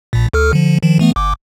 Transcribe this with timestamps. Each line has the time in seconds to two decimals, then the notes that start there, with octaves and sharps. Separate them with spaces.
0.13 A#1 A#2
0.33 D2 A4 F6
0.53 D3 F3
0.82 D#3 F3
0.99 E3 A3 B3
1.16 G1 D6